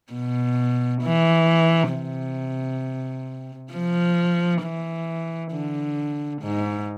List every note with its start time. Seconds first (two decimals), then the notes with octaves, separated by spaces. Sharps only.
0.13 B2
1.03 E3
1.92 C3
3.73 F3
4.62 E3
5.52 D3
6.42 G#2